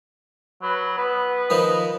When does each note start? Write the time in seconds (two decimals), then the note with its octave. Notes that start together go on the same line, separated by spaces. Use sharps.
0.62 F#3 B4
0.98 B3 B4
1.50 D#3 F3 D#5